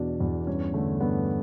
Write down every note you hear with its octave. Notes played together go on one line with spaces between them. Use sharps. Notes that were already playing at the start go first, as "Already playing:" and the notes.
Already playing: E2 B2 D4
E2
G2 C#4
D3 A3
G2 B3